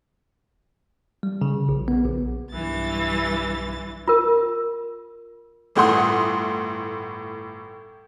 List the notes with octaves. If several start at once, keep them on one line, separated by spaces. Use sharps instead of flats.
G3
C#3
A#1
B3
A#1
B1 G2 E3 A6
F4 A#4
G1 A2 F#5 C6 D#6